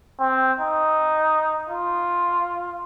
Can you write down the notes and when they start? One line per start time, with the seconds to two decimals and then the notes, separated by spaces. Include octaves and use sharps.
0.20 C4
0.60 D#4
1.70 F4